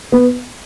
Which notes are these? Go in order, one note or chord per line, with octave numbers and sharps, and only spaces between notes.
B3